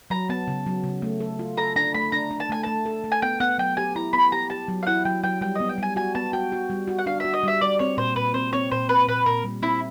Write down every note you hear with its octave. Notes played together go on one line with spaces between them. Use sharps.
F#3 A#5
B3 A5
C#3
F#3
C#3
A3
A4
F4
A4 A#5
D4 A#5
A3 B5
D4 A#5
D4
A5
A3 G#5
A3 A5
A4
A3
G#5
B3 G5
B3 F#5
F#3 G5
G4 G#5
E4 A#5
B3 B5
G4 A#5
G4 A5
F#3
F5
E4 F#5
F#3 G5
F#3 G5
G3 G5
B3 D#5
G5
G3 G#5
F#4 G#5
B3 A5
F#4 G5
F#4
G3
F#4
F#5
D4 F5
F#4 E5
D#5
G3 E5
G3 D5
C4 C#5
A#2 C5
A#2 B4
C4 C5
C4 C#5
A#2 C5
C4 B4
A#2 B4
A#2 A#4
G3
C4 E4